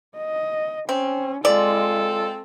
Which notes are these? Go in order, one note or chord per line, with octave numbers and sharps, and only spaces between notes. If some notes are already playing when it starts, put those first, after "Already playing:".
D#5
C4 C#4
G#3 C4 F4 A4 D5